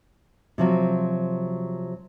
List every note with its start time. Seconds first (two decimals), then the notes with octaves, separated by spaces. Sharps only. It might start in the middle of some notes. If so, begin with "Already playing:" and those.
0.58 C3 F3 F#3